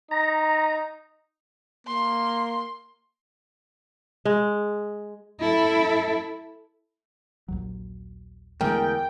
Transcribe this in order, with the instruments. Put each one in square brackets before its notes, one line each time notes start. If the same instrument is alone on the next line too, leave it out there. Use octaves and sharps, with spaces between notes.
[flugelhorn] D#4 [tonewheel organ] A#5
[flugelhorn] A#3 [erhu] C6
[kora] G#3
[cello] E4 A4
[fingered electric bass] A#1 D#2 F#3
[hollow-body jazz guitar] E2 [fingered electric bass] D3 G#3 A3 [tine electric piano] A#4 [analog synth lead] G5